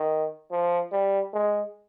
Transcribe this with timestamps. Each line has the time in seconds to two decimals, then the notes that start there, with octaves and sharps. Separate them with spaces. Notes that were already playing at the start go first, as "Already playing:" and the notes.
Already playing: D#3
0.51 F3
0.92 G3
1.33 G#3